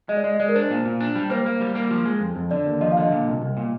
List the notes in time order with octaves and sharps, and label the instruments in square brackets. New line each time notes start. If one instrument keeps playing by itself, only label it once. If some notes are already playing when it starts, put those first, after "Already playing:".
[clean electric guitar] G#3 [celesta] D#5
[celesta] D5
[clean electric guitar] G#3 [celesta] D#5
[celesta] D#5
[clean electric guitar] G#3 [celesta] D5
[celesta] A#4
[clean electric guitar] D4 [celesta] C5
[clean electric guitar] A#2
A#2
D4
G3
[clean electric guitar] A#3 [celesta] C5
[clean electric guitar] A#3
G3
A#3
F3
G#3
F2
F2
[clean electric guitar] D3 [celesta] D5
[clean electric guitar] D#2
[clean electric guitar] F3 [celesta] D#5
[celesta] F5
[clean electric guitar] D3 [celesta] D#5
[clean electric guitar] A#2
C2
C2
A#2